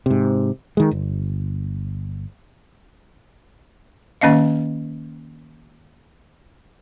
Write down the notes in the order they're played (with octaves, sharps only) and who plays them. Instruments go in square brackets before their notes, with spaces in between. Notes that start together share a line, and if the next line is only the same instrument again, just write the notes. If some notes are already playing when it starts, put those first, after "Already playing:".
[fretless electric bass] G#2 C3
D#3 G#3
G1
[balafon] D#3 A#3 C#4 D#5 F5